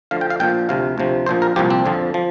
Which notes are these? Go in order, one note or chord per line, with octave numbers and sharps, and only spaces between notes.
D2 D3 F3 F5
G5
F5
A#1 A#2 F3 G5
D2 C3 F3 F5
D2 C3 F3
A#1 A#2 F3 C5
A#4
C2 A#2 F3 G4
C4
F2 D3 F3
F3